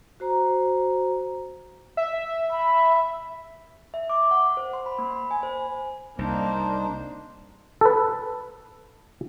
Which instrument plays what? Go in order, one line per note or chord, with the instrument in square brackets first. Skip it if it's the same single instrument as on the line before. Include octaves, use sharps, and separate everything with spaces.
[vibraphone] F#4 C5 A#5
[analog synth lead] E5
[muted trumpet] B5
[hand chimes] E5
D6
F#5
C5
C6
B5
A#3
B5
G#5
C5
[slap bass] C2 [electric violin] A#3 [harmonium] D4 D#4 C5
[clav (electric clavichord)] A4 B4